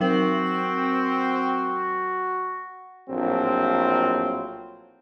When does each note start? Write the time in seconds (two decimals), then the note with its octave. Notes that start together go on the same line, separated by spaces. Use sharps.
0.01 F#3 C4 F#4 A#4 F#7
3.10 A#1 A2 F#3 C4 F4